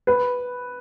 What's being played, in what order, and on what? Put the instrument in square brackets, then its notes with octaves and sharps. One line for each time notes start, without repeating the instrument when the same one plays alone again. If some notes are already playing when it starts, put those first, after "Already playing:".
[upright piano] B4